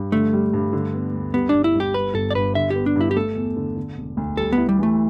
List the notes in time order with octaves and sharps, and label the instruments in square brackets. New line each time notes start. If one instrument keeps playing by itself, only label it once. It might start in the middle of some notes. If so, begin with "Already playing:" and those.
Already playing: [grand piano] G2
[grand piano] D3 [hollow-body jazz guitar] A3
[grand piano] G3
G2
D3
B3
D2
[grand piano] G3 [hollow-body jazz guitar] B3
[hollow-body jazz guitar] D4
[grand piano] G1
[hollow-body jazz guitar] E4
[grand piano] G2
[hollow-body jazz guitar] G4
[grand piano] G3 [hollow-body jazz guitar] B4
[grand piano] G1 [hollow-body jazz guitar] A4
[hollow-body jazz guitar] D5
[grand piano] G2 [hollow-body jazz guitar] B4
[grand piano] D3 [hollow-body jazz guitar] E5
[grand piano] B3 [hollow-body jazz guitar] G4
[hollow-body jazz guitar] D4
[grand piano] G2 [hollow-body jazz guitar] E4
[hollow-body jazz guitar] G4
[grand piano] A3 [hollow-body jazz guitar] A4
[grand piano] E2
D3
D3
E1
D2
[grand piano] G3 [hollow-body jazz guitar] A4
[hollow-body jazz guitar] B3
[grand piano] E4
[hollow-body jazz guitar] G3
[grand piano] E3 [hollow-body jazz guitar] A3